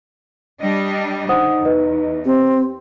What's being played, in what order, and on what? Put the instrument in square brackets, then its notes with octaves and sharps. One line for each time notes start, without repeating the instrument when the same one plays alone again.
[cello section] G3 D4 D#5
[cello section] D3 [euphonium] D#4 [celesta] C5 F#5 D#6
[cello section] E2 [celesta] B4 D#5
[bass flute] C4 [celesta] G4